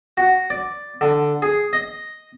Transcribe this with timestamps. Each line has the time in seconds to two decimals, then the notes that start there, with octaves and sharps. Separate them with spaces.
0.17 F#4
0.50 D5
1.01 D3
1.42 G#4
1.73 D#5